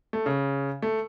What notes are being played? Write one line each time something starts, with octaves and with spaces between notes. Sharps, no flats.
A3
C#3
A3